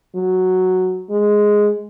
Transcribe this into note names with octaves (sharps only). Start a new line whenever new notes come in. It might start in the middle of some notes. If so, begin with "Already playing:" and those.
F#3
G#3